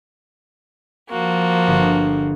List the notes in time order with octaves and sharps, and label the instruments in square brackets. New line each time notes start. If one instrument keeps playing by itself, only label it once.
[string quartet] F3 A#3 F#4
[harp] G1